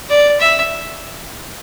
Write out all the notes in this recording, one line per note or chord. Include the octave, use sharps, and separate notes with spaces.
D5
E5